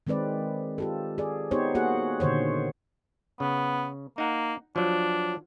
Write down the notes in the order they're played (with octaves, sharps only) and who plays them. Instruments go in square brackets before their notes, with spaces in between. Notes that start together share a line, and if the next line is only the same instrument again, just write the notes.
[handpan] D#3 G#3 C4 B4 D5
F4 G4 A4
G#4 D5
B3 D#4 G4 C5 C#5
A#3 F#4 G#4 F#5
A#2 D3 D#3 C5 C#5
[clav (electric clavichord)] C#3 [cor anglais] B3
[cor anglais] A#3 [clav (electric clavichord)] D#4 F#5
[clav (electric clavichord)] F3 F#3 [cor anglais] D4